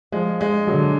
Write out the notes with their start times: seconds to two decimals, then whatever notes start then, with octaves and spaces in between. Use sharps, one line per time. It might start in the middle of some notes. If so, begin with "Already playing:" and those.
0.12 F3 G#3
0.41 G#3
0.67 D3 F#3